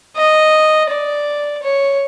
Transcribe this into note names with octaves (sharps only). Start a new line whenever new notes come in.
D#5
D5
C#5